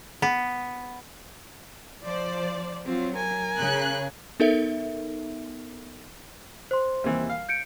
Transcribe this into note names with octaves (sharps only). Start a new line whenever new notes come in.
B3
F3 C5 D5
F#3 C4 F4
A#4 G#5
C#3 F#6
B3 D#4 A4 A#4 E5
C5 C6
D#2 C3 E3
F5
G6 C#7 D7